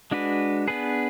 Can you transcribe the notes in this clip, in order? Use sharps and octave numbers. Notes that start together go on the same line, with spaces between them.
G#3 D4 F#4 B4
B3 D4 G#4 B4